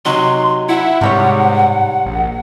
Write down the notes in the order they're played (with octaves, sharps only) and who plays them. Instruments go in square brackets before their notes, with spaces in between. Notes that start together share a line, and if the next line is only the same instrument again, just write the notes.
[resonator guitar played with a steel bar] C3 F#3 D#4 [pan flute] C6
[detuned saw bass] E4 [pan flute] F#5
[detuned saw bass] G#2 [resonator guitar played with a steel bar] C3 G3 C#5
[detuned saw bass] A#1